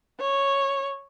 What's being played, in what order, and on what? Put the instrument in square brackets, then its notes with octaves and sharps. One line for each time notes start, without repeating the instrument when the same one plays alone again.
[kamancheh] C#5